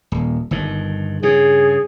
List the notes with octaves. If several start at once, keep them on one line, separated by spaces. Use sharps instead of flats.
D#1
G1 G2 D#3
G2 C#3 G#4